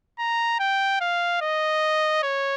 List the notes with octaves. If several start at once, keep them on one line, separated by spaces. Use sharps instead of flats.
A#5
G5
F5
D#5
C#5